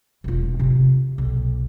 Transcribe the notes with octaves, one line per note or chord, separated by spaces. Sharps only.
E1 F4
C3
B1